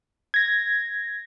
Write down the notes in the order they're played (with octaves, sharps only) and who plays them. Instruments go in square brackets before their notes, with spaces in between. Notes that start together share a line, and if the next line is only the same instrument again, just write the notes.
[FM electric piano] G#6 A#6